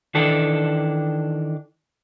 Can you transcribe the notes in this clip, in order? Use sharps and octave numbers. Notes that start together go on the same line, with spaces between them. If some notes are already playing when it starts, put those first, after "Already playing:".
D#3 E3 D4 A4